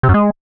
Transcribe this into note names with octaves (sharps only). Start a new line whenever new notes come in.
C3
F#2
G#3